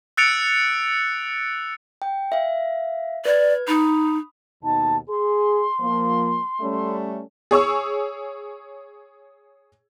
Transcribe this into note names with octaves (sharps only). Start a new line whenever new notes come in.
E6 F#6 A6 C#7 D7 F7
G5
E5 F5
B4 D5 G#6
D#4 B5 D#6
D#2 B2 D#4 A5
G#4 C6
F3 A#3
G3 A3 C#4
G#4 C#5 C#6 E6